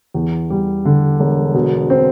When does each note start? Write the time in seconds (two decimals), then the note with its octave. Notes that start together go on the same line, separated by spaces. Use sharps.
0.14 E2
0.50 G3
0.85 D3
1.20 E1
1.54 B2
1.90 C4